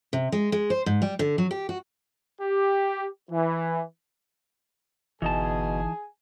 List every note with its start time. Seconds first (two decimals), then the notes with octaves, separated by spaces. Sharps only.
0.13 C3
0.32 G#3
0.52 G#3
0.70 C5
0.86 G#2
1.02 G3
1.19 D3
1.38 F#3
1.51 G4
1.69 F#4
2.41 G4
3.31 E3
5.22 G1 B2 E3 D#4 G#4 G#5 A5